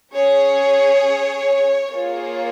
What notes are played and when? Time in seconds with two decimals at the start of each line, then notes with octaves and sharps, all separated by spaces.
0.14 C#4 G#4 C#5
1.92 A#3 F4 G#4 C#5